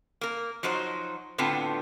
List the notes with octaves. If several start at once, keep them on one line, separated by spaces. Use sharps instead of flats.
A#3 A#4
F3 F#3 D#4 F#4 C5
A2 D3 B3 C4 F4 A5